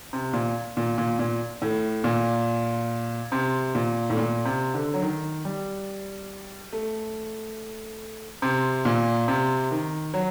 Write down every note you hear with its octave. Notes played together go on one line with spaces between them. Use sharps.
C3
A#2
A#2
A#2
A#2
A2
A#2
C3
A#2
A2
A#2
C3
D3
F#3
D#3
G3
A3
C3
A#2
C3
D#3
F#3